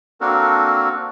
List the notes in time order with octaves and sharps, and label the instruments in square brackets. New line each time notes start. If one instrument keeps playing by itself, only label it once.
[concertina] A#3 C4 D4 F#4 A4 A#4